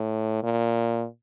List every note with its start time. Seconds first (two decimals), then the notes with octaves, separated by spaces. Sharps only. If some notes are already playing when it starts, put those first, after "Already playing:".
Already playing: A2
0.43 A#2